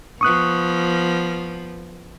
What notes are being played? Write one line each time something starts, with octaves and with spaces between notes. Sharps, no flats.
F3 B3 C#6 D#6 F#6